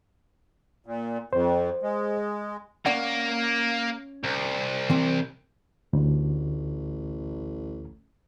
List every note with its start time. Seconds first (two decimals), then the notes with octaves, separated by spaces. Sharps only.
0.86 A#2
1.33 F2 C5
1.83 G#3
2.86 A#3 C#4 D5 F#5
4.24 C2
4.90 E3 C4
5.93 A1 D2